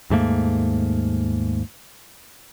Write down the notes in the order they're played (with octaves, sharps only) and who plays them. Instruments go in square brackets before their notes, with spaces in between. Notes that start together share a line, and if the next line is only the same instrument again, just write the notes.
[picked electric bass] D#2 G#2 A3 A#3